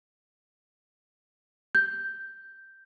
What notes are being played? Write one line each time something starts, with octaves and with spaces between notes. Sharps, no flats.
G6